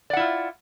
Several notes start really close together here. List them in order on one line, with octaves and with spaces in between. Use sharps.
D5 F#5 E4 F4